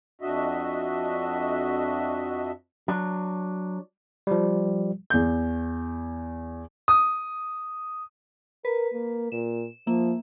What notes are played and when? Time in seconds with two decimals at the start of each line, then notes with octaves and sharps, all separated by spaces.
0.21 F2 D4 F#4 D#5 E5
2.88 F#3 D4
4.27 F3 G3
5.10 E2 G6
6.88 D#6
8.65 A#4 B4
8.93 A#3
9.32 A#2 E7
9.87 F3 A#3 E5